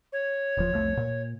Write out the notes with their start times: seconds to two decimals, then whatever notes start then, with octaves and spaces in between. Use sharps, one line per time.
0.12 C#5
0.57 D#1 F3
0.72 C2 F2 A3
0.97 A#2